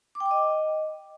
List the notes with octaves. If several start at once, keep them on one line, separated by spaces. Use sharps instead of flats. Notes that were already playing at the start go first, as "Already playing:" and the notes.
D6
G5
D6
D#5